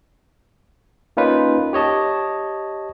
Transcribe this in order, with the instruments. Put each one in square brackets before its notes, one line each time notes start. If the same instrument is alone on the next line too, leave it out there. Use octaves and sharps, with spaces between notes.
[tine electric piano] A#3 C#4 D#4 F4 B4
G4 C#5 D#5 A5